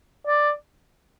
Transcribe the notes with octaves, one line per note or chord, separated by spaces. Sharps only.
D5